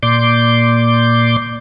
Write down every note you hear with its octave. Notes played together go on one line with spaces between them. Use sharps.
A#2 D5 C6 D6 G6